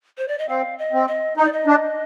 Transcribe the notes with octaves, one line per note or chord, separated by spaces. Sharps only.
C5
D5
D#5
C4 F5
D#5
C4
D#5
D#4 D#5
D5
D#5
D4